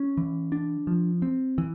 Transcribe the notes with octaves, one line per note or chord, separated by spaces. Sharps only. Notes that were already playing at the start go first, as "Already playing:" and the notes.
Already playing: C#4
E3
D4
F3
C4
E3